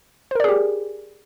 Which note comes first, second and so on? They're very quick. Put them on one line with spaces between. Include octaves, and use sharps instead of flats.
C5 A#4 D5 G#4 G4